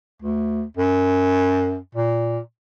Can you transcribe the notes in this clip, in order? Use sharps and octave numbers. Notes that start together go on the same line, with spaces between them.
D2
F#2
A#2